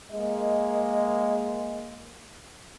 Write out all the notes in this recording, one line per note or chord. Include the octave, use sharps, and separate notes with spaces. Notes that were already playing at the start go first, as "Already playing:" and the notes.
G#3 A#3 D#5